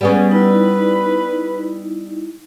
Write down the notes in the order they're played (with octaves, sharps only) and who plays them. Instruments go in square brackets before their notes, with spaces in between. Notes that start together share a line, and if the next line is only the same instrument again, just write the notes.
[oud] G3 B3 C#4 [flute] G#4
[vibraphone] D#4 E4 [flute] B4